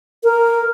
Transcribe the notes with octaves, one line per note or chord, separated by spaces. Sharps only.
A#4